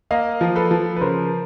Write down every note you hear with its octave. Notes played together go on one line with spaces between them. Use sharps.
A#3 D#5 F5
F3
A4 B4
F3
B4
C#3 A#4 C5